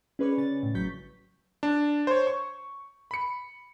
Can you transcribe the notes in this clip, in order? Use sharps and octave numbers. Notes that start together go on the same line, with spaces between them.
C#4 G#4 B4 C#5 D5 C#6
C#3 A6
A2
A1 F#3 C#6 G6 B6
D4
C5 C#5
C#6
B5 C#7